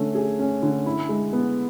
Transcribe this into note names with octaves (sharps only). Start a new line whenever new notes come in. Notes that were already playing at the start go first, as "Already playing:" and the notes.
Already playing: D3 A3 C#4
G#4
C#4
D3
E4
G#3
B3